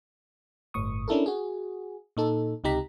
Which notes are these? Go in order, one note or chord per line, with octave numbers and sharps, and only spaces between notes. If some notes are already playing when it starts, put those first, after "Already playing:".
G1 A2 C#6 D#6
C#4 D4 E4 A4 A#4
F#4 G#4
A#2 D#4 A4
C#2 C3 D#4 G4 A#5 B6